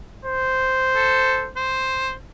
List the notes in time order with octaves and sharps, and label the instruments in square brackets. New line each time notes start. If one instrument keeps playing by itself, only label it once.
[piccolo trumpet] C5
[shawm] A4
C5